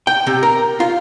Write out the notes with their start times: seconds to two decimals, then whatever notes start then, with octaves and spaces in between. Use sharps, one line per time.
0.07 G5
0.27 C3
0.43 A#4
0.80 F4